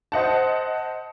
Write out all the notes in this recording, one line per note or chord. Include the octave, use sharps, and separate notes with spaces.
C5 D#5 F#5 A5